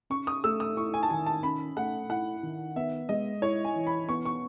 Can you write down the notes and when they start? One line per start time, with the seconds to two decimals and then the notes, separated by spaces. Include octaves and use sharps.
0.10 C#4 C#6
0.27 D#6
0.44 A3 E6
0.60 D#6
0.77 E4 C#6
0.94 G#5
1.03 A5
1.10 D#3 G#5
1.26 A5
1.43 C#4 B5
1.76 A3 F#5
2.10 E4 F#5
2.43 D#3
2.76 B3 E5
3.09 G#3 D#5
3.42 E4 C#5
3.65 G#5
3.76 E3
3.87 B5
4.09 B3 C#6
4.25 C#6